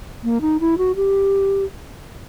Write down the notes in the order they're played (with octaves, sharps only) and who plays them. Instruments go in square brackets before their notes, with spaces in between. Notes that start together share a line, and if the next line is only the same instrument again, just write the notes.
[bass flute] A#3
D#4
E4
F#4
G4